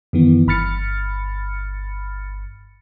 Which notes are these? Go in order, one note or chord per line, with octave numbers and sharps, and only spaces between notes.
F#2 D#3 E3 B3
G1 G2 B5 F6 A6 C#7